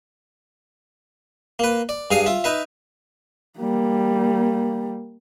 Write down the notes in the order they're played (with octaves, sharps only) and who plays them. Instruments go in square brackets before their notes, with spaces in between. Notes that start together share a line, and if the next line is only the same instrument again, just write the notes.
[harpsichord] A#3 B4
D5
G2 G#4 F5 G#5 D#6
F4 E5
D#4 B4 E5
[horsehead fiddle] G3 A#3